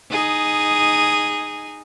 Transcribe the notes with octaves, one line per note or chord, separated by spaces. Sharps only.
D#4 G#4